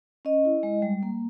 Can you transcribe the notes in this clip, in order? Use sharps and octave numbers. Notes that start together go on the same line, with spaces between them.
C#4 D#5
E4
G#3
G3
A#3